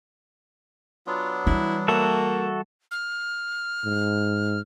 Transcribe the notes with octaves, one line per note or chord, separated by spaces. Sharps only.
F#3 B3 D4 F4
E3 G3 E4
A#3 F#4 A4 E5
F6
G#2